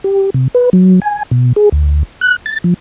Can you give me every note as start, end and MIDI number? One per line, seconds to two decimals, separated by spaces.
0.04 0.30 67
0.34 0.48 48
0.55 0.70 71
0.73 1.00 54
1.02 1.23 80
1.31 1.53 47
1.56 1.69 68
1.72 2.03 38
2.21 2.36 90
2.46 2.58 93
2.64 2.74 53